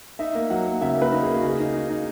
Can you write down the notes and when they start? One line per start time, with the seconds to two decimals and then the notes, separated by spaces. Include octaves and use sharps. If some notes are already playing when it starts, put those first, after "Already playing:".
0.19 D#4 E5
0.35 A#3
0.50 F#3 F#5
0.66 A#3
0.81 C#3 E5
0.97 A#3
1.02 B4
1.12 D#4
1.23 A#3 G#4
1.36 F#4
1.43 C#3
1.49 G#4
1.59 D#4
1.74 D#4
1.90 D#4